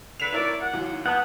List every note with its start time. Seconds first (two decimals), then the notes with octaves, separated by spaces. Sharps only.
0.20 D3 B4 B6 E7 F7
0.33 A2 E4 A#4 D5
0.59 F#5
0.73 D#2 E3 F#3
1.06 G3 B3 F#5 A5 D#6 G6